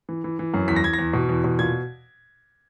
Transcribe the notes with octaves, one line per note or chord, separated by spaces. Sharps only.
E3
E3
E3
F#2
E2 B6
A#6
E2 G#6
A#6
E2
B2
E2
B2
A#2 G#6